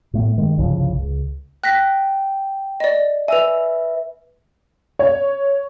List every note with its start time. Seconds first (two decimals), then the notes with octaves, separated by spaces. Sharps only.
0.14 A2 A3 B3
0.37 G2 D#3 G#3
0.58 G1 C2 C#3 F3
0.99 C#2
1.64 G5 F#6 A#6 B6
2.80 D5 D#5
3.28 B4 E5 G#5 E6 F7
4.99 C#5